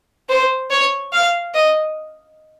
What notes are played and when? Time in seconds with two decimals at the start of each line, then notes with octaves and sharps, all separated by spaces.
0.29 C5
0.70 C#5
1.12 F5
1.54 D#5